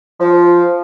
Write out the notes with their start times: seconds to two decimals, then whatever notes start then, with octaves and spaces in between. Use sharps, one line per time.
0.20 F3